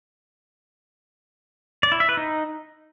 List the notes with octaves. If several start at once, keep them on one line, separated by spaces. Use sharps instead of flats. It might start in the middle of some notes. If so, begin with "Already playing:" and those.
D5
E4
E5
B4
D#4